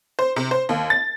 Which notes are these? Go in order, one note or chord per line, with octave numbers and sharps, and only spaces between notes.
C5
C3
C5
D#2
A6